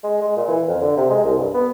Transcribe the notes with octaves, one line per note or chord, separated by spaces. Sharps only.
G#3
G#3
A#2
E3
F2
D3
C3
G#3
C2
G2
B3